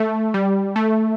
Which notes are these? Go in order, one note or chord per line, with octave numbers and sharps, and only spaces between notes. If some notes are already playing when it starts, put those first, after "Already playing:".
Already playing: A3
G3
A3